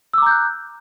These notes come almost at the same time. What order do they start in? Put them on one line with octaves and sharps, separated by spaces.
E6 D6 A#5 G6 F#6